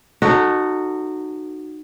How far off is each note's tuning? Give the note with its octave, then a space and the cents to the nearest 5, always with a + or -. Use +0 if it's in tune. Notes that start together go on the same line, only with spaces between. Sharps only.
D#4 -25 F#4 +0 A4 +0